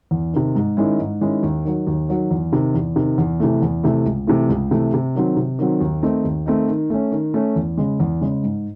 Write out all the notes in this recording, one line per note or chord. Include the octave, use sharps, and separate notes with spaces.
E2
C3 D#3
G#2
D#3 G#3 C#4 E4
G#2
D#3 G#3 C#4 E4
D#2
D#3 F#3
D#2
D#3 F#3
E2
C3 D#3
E2
C3 D#3
E2
C3 E3 A3
E2
C3 E3 A3
C#2
C3 E3 A3
C#2
C3 E3 A3
C3
D#3 F#3 C4
C3
D#3 F#3 C4
D#2
D#3 A3 C4 D#4
D#2
D#3 A3 C4 D#4
D#3
A3 C#4
D#3
A3 C#4
E2
C#3 G#3
E2
C#3 G#3
G#2